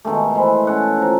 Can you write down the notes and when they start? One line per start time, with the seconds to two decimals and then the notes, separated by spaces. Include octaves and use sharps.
0.05 B2 D#3 G#3 A3
0.35 E3 E4 C5
0.67 C#4 A4 F#5
0.98 F3 A#5